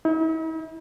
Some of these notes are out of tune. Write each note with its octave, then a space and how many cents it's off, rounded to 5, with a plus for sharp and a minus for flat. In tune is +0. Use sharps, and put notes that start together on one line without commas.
E4 -45